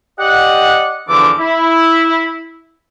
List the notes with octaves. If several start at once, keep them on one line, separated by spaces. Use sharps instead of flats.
G4 D5 D#5 F#5
E2 D3 E3 F3 D6
E4